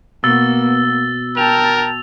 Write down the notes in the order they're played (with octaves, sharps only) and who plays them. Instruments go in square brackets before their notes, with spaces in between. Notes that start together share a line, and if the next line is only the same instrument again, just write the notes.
[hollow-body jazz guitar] B2 [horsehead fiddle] A#3 B3 [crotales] E6 A6 G7
[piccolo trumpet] A#4 [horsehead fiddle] G5 A5 [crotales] F7